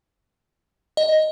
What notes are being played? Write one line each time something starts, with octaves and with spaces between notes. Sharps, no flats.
D#5